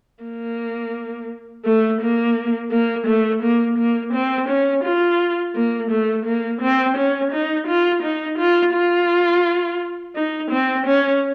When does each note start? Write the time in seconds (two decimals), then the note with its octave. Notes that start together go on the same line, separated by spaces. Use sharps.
0.24 A#3
1.65 A3
2.01 A#3
2.72 A#3
3.07 A3
3.43 A#3
3.78 A#3
4.13 C4
4.49 C#4
4.84 F4
5.55 A#3
5.91 A3
6.26 A#3
6.62 C4
6.97 C#4
7.32 D#4
7.68 F4
8.03 D#4
8.38 F4
8.74 F4
10.16 D#4
10.51 C4
10.87 C#4